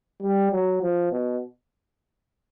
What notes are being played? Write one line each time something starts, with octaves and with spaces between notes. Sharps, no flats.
G3
F#3
F3
B2